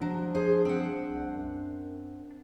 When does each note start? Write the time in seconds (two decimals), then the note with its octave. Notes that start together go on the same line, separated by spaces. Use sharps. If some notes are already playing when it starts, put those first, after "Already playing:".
0.01 F3 F#3 D4
0.35 G#4 C5
0.65 C4 F#5
1.08 C2
1.35 F#2